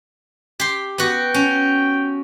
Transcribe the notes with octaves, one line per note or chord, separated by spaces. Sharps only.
G4 C6
B3 F#4 G5
C#4